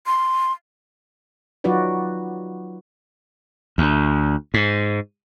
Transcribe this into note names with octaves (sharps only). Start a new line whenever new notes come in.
C6
F#3 D#4 F4 F#4 B4 D5
D2
G#2